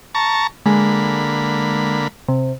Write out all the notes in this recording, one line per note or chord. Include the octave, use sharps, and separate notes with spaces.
A5 A#5 C#6
D3 G#3 A#3 B5
C3